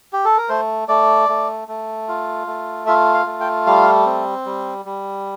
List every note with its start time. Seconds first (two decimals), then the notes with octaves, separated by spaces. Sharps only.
0.13 G4
0.25 A4
0.37 A#4
0.49 A3 C5
0.88 A3 D5
1.29 A3
1.68 A3
2.09 F4
2.47 A3
2.87 F4 E5
3.14 F5
3.26 A3
3.40 G5
3.67 G3 F5
4.06 C4
4.46 G3
4.85 G3